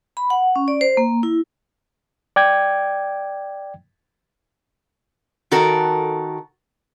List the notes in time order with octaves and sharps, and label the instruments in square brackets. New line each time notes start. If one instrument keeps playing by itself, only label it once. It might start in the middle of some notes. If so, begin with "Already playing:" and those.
[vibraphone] B5
F#5
C#4
D5
C5
A#3
E4
[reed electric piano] D5 G5 G#6
[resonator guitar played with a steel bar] D#3 F#4 A4 A#4